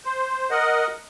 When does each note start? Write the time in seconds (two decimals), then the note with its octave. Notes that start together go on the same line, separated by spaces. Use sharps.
0.05 C5
0.51 A#4 D#5 F#5